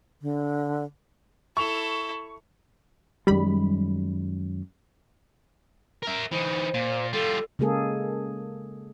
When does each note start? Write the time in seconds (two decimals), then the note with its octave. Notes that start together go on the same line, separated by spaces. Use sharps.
0.22 D3
1.57 E4 A4 C#6 F7
3.27 F#2 D#3 G3 G#3 B5
6.03 A#4 E5
6.31 E3 D#4 C5
6.74 A#2
7.13 G3 F4 A4
7.59 C#3 G#3 A#3 G#4 A4